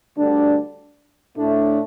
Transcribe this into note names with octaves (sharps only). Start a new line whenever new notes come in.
D2 D3 G3 D4
A2 A3 D4